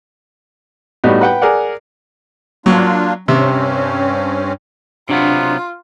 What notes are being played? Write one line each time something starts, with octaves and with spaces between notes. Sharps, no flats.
A2 G3 B3 D#4 F#4
B4 F#5 G5
G#4 A#4 D5 F#5
F#3 A#3 D4 F4
G2 C3 C4 C#4
C3 F#3 B3 D4 F4